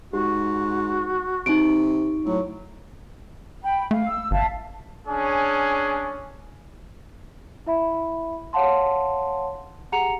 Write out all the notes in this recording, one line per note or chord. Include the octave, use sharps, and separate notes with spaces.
G#2 F#4 G4
C3 D#4 C#6 D7
A2 F#3
G5 B5
A3 F5
E6
G1 E5 F5 A5
C#4 D4 G#4
E4 E5 B5
C#5 F5 F#5 A5 C6
G4 G#4 F#5 A#5 C#7 F7